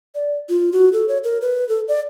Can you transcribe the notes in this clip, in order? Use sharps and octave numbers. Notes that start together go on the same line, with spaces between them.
D5
F4
F#4
A4
C#5
A#4
B4
A4
D5